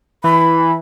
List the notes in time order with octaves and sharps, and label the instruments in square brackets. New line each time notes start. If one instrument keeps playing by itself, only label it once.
[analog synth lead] E3 [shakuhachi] B5